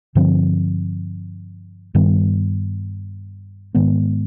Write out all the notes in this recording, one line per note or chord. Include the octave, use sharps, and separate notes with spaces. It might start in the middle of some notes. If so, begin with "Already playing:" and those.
G2 D3 F3 C4
G2 D#3 G3 B3
G#2 D#3 G#3 B3